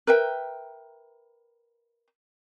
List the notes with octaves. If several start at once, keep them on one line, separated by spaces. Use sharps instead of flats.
A#4 B4 E5 G5